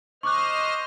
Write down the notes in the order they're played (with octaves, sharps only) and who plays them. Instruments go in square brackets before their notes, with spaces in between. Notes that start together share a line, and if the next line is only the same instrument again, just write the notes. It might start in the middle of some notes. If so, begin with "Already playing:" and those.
[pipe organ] C5 D#5 F6 [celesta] C#6 D6 F#6